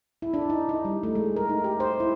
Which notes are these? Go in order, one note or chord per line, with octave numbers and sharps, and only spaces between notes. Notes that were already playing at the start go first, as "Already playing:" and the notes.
E4
D4
D#4
D#4
G3
A3
G#3
A#4
D#4
G4
C5
E4